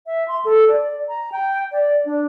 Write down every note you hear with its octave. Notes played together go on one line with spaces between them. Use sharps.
E5
C6
A4
D5
A#5
G5
D5
D4